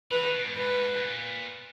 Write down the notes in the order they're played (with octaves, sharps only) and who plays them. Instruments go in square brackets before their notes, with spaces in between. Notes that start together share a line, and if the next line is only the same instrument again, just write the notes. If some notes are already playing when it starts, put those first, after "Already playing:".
[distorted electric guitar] E3 [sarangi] B4
[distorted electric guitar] D#3
B2
G#2
[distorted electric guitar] G#2 [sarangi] B4
[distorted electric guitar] B2
A#2